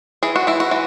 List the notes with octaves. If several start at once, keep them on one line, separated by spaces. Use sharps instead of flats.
E3 G#4
F#4
E3 E4
F#4
E3